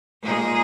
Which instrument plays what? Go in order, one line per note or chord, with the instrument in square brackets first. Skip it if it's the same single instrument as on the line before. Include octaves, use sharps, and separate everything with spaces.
[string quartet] A#2 G#3 D#4 G#4